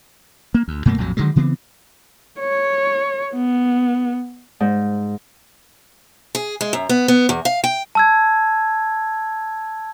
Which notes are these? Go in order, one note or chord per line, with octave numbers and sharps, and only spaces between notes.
A#3
D2
F#2 B2 A3 A#3
A#1 F2 A2 F#3
D3 D#3 F#3 G#3
C#3 E3 B3 C4
C#5
B3
G#2
G#4
G#3
F#2
B3
B3
E2
F5
G5
A5 E6 G#6